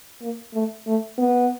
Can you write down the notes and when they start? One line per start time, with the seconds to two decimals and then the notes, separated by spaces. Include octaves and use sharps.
0.21 A#3
0.54 A3
0.87 A3
1.18 B3